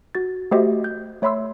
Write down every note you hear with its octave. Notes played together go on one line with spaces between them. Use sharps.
F#4 A6
A3 F#4 G4 C5 D#5 E5
G6
A3 C#5 E5 B5 C6 E6